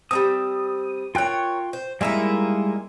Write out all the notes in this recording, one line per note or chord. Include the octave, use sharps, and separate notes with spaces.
G3 A#3 C4 D#6
F4 A#4 C#5 G5 F#6
C5
G3 G#3 A#3 D#4 E4 E5